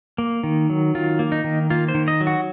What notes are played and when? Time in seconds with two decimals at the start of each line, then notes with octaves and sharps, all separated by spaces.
0.18 A#3
0.44 D#3
0.70 F#3
0.95 D#3 F4
1.19 A#3
1.32 D#4
1.44 D#3
1.70 A#3 F4
1.88 C5
1.95 D#3
2.08 D#5
2.20 F#3
2.27 F#4